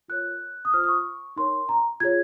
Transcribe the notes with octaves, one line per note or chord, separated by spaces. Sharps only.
F4 A#4 C#5 F#6
D#6
F4 C5 F6
D#6
C#6
D#4 A#4 C#5 C6
A#5
F4 G#4 C#5 G#6